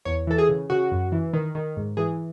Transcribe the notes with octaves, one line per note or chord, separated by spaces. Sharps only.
E2 C#5
E3 A4
G#4
C#3
C#3 F#4
F#2
E3
D#3
D#3
G#2
E3 G#4